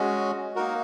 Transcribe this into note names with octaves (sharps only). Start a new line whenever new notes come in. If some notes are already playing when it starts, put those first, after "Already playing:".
Already playing: G#3 C#4 F#4
A#3 D#4 F#4 A#4